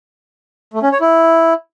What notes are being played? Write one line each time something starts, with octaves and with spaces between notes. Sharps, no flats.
A3
C#4
C#5
E4